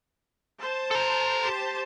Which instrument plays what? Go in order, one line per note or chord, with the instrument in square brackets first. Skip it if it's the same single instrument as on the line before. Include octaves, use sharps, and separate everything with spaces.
[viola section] C5 A5
[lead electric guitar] A4 A#5
[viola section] G4 C5 A5